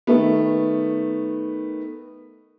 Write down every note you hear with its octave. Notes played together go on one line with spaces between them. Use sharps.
D#3 A3 B3